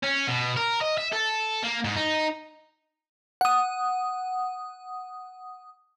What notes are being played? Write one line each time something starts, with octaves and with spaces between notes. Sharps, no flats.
C#4
B2
A#4
D#5
E5
A4
A#3
G#2
D#4
F#5 D#6